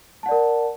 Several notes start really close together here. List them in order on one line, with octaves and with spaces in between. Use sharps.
A5 F#5 D5 A#4